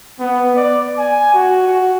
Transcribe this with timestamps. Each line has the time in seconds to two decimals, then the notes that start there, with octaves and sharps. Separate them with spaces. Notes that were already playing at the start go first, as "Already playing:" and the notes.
0.20 B3
0.56 D5
0.98 G#5
1.34 F#4
1.68 F#4